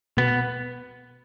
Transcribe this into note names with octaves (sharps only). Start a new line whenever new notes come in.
B2 B3